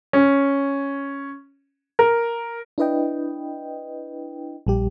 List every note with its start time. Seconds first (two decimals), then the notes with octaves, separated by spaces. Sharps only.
0.13 C#4
1.99 A#4
2.78 D4 E4 B4 D#5 G5
4.67 A#1 G3 G4